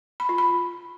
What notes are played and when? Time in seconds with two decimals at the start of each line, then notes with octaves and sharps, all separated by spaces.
0.20 B5
0.29 F4
0.38 B5